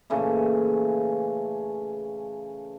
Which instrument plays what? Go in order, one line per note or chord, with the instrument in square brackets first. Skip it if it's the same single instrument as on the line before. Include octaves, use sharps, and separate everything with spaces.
[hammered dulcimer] A#2 C#3 E3 A3